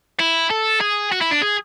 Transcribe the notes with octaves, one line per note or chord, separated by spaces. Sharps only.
E4
A4
G#4
F#4
E4
D4
G#4